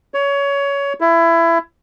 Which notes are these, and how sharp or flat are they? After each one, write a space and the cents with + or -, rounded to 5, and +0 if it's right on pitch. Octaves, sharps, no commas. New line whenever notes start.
C#5 +20
E4 +20